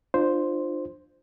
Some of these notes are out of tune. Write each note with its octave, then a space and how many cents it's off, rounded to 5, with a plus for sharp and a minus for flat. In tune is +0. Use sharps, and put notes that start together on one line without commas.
D4 +35 F4 +0 C5 +0